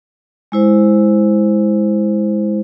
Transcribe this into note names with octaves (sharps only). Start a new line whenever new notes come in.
G#3 E4 C5